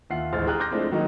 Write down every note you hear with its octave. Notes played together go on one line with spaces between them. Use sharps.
D#2 F4 E5 F#5 C7
A1 D2 G#3 C5 F6 A6
G4 G#4 G5 A#5 F6 F#6
C6 D6 F6 G6 A#6
F3 G#3 A3 C4 D4 E4
D#3 F#3 A#3 D#4